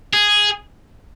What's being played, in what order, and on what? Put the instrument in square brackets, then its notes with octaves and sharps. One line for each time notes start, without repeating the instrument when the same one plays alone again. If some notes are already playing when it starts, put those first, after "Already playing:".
[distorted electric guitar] G#4